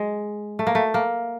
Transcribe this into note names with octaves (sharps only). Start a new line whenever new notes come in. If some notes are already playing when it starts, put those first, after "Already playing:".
Already playing: G#3
A3
A#3
A3
A#3